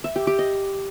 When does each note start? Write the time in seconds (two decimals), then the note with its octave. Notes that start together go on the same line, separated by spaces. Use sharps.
0.04 E5
0.16 G4
0.27 G4
0.39 D#5